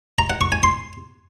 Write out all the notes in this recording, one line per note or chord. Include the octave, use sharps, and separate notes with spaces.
A#5
F#5
C#6
G#5
C6